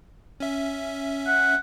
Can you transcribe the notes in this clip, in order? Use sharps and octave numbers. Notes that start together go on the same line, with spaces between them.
C#4 E5
F#5